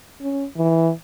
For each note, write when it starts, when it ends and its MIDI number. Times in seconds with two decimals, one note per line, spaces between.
0.21 0.45 61
0.56 0.91 52